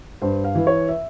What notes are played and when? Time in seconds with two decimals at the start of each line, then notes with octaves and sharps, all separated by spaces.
0.22 G2 C5
0.44 F5
0.55 E3
0.67 C#5
0.89 E5